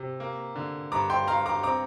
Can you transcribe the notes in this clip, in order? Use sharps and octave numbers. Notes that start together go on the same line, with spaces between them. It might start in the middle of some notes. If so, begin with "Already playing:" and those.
Already playing: C3
A#3
D3
G2 A#5 D6
G5 C6
G2 F5 A#5
A#5 D6
C4 A#5 D6